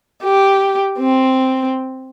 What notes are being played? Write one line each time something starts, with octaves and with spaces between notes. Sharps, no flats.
G4
C4